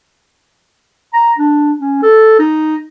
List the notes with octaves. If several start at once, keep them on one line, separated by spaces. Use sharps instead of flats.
A#5
D4
C#4
A4
D#4